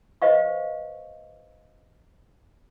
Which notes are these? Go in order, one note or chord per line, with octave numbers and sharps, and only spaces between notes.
B4 C5 D#5 F5 C#6